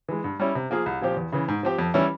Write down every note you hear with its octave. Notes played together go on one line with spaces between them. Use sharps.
E3 G#3
G2
G3 C#4 E4
C3
F3 A#3 F4 G#4
C2
A#2 F3 C4 G4
E2
C#3 E3
G#2
F3 C4 G4
F2
E3 G3 C#4 E4